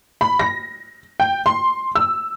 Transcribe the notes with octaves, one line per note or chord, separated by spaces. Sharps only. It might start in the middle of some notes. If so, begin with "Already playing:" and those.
B5
A#6
G5
C6
E6